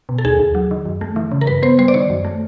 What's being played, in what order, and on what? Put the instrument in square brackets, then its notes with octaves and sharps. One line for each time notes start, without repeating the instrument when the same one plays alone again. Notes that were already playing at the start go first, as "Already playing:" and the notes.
[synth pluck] B2
A4
D#2 G#4
D#2
F#3
D#3
F#2
A3
E3
C#3
A#4
G2 B4
B3 C5
G3 C5
D5
D#3 C#5
F#2
A3